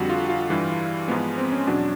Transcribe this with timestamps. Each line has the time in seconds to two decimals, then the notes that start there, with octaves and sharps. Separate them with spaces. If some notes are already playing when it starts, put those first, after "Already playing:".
Already playing: F2 D3 G3 F#4
0.10 F4
0.29 F4
0.49 G2 E3 G3
1.08 G#2 F3 G#3 B3
1.38 C4
1.52 C#4
1.67 E2 B2 F#3 D4